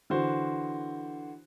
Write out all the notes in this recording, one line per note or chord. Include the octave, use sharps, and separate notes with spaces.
D3 E3 F#4 C5